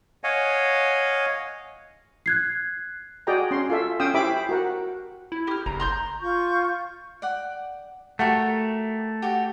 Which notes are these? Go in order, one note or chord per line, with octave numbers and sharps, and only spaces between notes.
C#5 D#5 F5 F#5 G#5
F#6 G#6 C7
F#4 G#4 D5 D#5 G5 A#5
C#4 C6
F4 A4 E5
C#4 F5 G5 D#6 E6
E4 G4 C5 E5 B5 D6
F#4 A#4 F#5
E4
G4 F6
F#1 A#5
A#5 C6 G6
F4 C#6 G6
D5 F#5 G5
A3 F#4 G4 A#4
F#4 G4